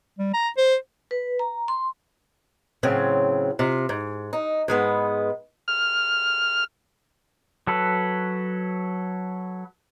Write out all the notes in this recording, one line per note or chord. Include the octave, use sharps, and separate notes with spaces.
G3
A#5
C5
B4
A#5
C6
A2 C#3 F#3 C4
C3 F4
G#2
D#4
G#2 G#3 B3
F6
F#3 A4 B4